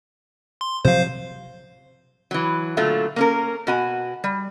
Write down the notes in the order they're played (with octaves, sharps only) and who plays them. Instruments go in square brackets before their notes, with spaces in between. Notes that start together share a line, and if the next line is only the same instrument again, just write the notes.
[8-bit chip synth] C6
[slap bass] C3 F3 F#3 [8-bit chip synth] C5 F5
[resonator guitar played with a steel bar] E3 F#3
A#2 D3 F#3 A3 F4
A#3 C#4 A#4
B2 F#4 G#5
G3